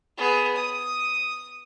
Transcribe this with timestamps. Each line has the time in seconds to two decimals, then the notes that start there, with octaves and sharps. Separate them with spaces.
0.17 B3 G#4
0.56 D#6